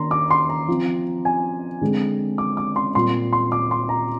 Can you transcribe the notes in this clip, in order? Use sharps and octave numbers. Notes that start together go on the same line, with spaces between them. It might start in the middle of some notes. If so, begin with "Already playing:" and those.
Already playing: D#3 A#3 D4 A#5 C6
D6
C6
A#5
F3 C4
G#5
D3 G#3 C4
D6
D6
C6
A#2 G3 C4 C6
C6
D6
C6
A#5